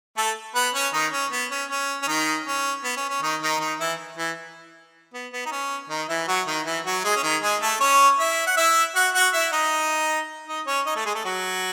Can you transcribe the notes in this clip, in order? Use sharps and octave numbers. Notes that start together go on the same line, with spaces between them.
A3 A4
B3 B4
C#4 C#5
D#3 D#4
C#4
B3
C#4
C#4
C#4
D#3 D#4
C#4
B3
C#4
C#4
D#3 D#4
D#3 D#4
D#3 D#4
E3 E4
E3 E4
B3
B3
D#4
C#4
D#3 D#4
E3 E4
F#3 F#4
D#3 D#4
E3 E4
F#3 F#4
G#3 G#4
C#4
D#3 D#4
G#3 G#4
A3 A4
C#4 C#5
E4 E5
F#5
E4 E5
F#4 F#5
F#4 F#5
E4 E5
D#4 D#5
D#4 D#5
C#4 C#5
D#4 D#5
A3 A4
G#3 G#4
A3 A4
F#3 F#4